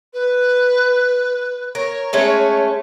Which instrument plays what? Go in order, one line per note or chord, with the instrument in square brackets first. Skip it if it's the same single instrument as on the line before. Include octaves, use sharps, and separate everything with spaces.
[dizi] B4
[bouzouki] A#4 [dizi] C#5
[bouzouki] G#3 A3 C#4